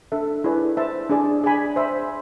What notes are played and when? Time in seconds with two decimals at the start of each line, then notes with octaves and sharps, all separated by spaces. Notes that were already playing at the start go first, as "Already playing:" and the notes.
0.12 D4 A4 E5
0.44 E4 G#4 B4 D5
0.77 C5 E5 A5
1.10 D4 G#4 D5
1.44 G#4 D5 G#5 B5
1.76 C5 E5 B5